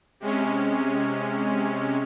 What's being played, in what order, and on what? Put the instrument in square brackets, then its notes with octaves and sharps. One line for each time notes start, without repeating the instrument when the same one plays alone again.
[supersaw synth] C3 G#3 C#4